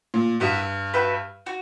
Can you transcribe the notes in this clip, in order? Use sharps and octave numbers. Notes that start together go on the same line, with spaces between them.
A#2
G2 B3 E4 A#4 E5
F#4 B4 E5 G5
F#4